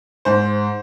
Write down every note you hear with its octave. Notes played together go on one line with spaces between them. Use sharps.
G#2 C5